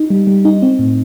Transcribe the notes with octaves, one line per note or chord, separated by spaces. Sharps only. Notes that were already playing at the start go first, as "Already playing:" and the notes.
Already playing: D#4
G3
G3
D#4
C4
A2